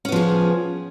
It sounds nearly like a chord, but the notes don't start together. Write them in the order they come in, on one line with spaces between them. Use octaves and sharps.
C#4 B3 F3 G#4